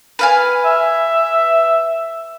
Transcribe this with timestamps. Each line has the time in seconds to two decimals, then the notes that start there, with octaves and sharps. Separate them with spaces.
0.19 B4 F5 G#5
0.65 E5